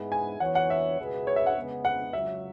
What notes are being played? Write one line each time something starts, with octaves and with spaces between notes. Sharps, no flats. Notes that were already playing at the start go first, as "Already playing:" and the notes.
Already playing: G#2 G#3 B3 E4 G#4
G#5
E3 B3 F#4 C#5 F#5
F#5
E5
C#2 B2 B3 G#4 B4
C#5
E5
F#5
C#3 G#3 B3
F#5
C#2 C#3 F#3 E5